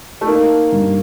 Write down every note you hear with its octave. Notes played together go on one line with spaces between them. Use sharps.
A3
A#3 D#4
G2